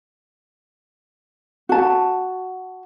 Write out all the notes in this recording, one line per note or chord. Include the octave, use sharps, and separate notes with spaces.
F#4 A5